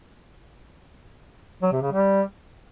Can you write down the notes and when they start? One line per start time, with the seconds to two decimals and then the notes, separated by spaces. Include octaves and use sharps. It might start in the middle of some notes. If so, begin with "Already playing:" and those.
1.62 F#3
1.72 C3
1.82 C#3
1.92 G3